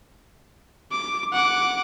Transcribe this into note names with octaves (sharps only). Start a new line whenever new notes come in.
D6
F#5 D6